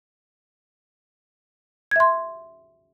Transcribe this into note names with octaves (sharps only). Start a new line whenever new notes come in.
E5 C6 G#6